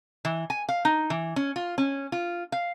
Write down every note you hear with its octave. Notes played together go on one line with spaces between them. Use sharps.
E3
G#5
F5
D#4
E3
C#4
F4
C#4
F4
F5